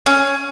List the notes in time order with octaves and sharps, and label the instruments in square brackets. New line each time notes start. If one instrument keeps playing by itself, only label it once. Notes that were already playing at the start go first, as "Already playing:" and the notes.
[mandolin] C#4